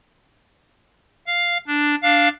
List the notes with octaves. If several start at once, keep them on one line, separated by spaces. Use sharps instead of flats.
F5
D4
D4 F5